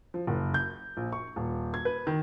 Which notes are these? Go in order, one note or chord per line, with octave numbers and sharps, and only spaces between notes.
F3
F#1
G6
A#1
C#6
D#1
G#6
B4
D#3